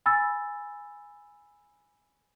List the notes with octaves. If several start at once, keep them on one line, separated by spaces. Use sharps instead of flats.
G#5 B5 E6 A6